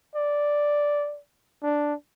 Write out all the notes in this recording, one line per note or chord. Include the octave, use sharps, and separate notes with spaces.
D5
D4